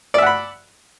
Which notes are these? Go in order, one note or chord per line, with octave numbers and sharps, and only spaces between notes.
D5 E5 F#5 B5